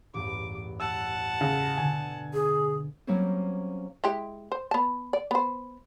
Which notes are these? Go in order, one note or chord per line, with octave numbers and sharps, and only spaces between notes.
A1 E2 G2 D6
F#5 A5 E6
C#3 E6
B2 D3 G#5
G#4
F#3 G3 A#3 C4 C#4 C5
G#3 E4 G4
C5
B3 A5
D5
B3 C5